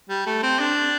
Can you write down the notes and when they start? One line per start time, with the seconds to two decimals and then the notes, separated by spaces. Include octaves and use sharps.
0.09 G3
0.26 A3
0.43 C4
0.59 D4